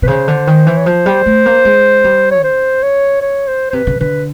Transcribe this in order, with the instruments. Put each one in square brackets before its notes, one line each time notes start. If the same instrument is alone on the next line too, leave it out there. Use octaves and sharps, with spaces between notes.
[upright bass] C3 [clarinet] B4
[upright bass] C#3 [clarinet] C5
[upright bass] D3
D#3
E3
[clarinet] C#5
[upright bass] F3 [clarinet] C5
[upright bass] G3
A3
A#3
G#3
G3
[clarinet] C#5
[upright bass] C#3 [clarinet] C5
[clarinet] C#5
C#5
C5
C5
[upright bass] C3 [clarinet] B4
[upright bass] C#3
[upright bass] D3 [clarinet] B4